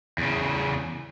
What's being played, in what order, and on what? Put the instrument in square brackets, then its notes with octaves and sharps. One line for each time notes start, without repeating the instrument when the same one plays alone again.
[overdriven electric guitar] E2 C#3